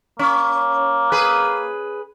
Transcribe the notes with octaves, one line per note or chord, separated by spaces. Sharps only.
A#3 C#4
G#4 B4